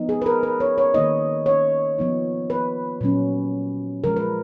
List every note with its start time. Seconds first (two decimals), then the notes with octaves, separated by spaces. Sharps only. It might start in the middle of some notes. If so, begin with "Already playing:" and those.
Already playing: F3 B3 D#4
0.09 G#4
0.22 B4
0.26 A#4
0.43 B4
0.60 C#5
0.78 C#5
0.94 D#3 A#3 D#4 D#5
1.46 C#5
1.98 F3 B3 D#4
2.50 B4
3.01 A#2 F#3 C#4
4.04 C#3 F3 G#3 A#4
4.16 B4